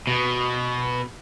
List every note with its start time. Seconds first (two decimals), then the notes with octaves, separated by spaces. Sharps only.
0.07 B2